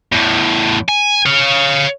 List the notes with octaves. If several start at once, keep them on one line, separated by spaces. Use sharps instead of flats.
E2 A2
G#5
C#5 F5